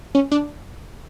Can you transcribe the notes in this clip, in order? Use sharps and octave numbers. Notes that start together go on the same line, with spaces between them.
C#4
D4